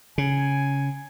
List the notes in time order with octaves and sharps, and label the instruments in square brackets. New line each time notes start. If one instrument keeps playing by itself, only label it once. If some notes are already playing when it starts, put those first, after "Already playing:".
[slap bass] C#3 [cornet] G#5